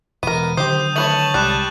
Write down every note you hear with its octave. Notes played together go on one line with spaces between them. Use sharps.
E1 B3 A#4 D#7
D3 D#3 F#3 G4 C5 D#6 G6
A3 B4 C#5 A5 C#6 F#7
C2 G3 G#3 F#6